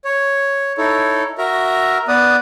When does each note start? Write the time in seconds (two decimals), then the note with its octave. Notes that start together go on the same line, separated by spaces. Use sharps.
0.05 C#5
0.78 D#4 E4 A4 C#5
1.38 F#4 A#4 E5 A#5
2.08 B3 B4 D5 D#6